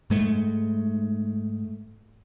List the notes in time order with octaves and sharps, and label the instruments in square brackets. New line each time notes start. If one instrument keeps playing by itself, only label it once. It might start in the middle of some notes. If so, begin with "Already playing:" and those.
[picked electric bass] G#2 G#3 A3